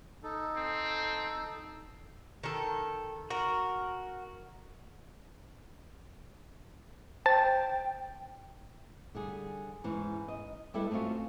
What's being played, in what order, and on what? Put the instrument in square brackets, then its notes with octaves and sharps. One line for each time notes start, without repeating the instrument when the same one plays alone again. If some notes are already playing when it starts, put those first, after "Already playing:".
[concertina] D#4 A4
[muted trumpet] C4
[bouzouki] D#3 A4
[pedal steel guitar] F#4 [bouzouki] A#4
[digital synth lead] C5 [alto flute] G5 [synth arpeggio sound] A5
[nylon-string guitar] D3 G3 G#4
G#2 E3 C#4
D#5
G3 D4 E4 A4 B4 D#5
A3 C4 C#4 F4 F#4